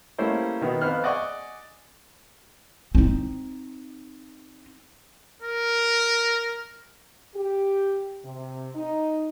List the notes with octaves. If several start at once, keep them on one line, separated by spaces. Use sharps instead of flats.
G3 A3 A#3 C#4 E4 C5
B2 D#3 B3 F#4
F2 B3 C5 F6 F#6
D5 D#5 F#5 G#5 C#6 D6
C4 D#4
A#4
G4
C3
D#4